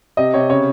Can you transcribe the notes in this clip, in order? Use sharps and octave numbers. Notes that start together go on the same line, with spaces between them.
C3 D#5
C3 C#5
C#3 C#5